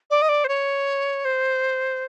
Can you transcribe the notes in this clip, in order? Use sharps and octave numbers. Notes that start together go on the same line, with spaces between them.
D5
D#5
D5
C5
C#5
C5